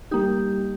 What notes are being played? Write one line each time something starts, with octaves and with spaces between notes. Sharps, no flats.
G3 A#3 D#4 G4